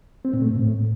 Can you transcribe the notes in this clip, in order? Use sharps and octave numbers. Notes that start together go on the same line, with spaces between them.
C4
A#2
A3
G#2
A2